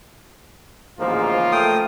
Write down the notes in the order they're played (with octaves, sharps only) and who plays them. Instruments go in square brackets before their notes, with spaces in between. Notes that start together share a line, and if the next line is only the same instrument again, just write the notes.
[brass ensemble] A1 D2 G#2 [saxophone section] C#3 F3 A#3 [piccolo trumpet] F4
[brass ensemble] A3 [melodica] G5 D#6